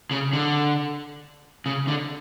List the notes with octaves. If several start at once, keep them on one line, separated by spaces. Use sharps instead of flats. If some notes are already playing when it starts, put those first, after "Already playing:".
C#3
D3
C#3
D3